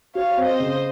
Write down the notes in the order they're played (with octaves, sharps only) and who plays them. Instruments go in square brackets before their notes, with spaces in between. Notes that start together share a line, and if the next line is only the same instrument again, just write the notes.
[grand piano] F#4 [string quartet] C#5 F5
[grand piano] C4
[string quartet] C5 D#5
[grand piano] C#3